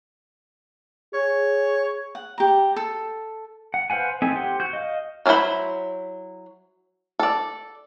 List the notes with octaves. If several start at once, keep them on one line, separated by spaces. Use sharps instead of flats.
G#4 C#5
F#5
G4 A#5
A4
F#5
B4 C5 F5 F#5 G#5
C4 D#4 A4 E5 G#5
G4 C5 F#5
F#4 G6
D#5 F5
F#3 C#4 E4 C5 B5
A4 D5